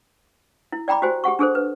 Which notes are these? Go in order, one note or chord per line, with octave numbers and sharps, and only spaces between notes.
E4
D5 G5 A#5 B5 D6
F#4 G4 C5 G#5
G4 G#4 F#5 C#6
D4 G#4 A4 C5
B4